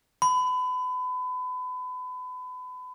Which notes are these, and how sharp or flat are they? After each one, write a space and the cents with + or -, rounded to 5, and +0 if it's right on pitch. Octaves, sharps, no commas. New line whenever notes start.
B5 +30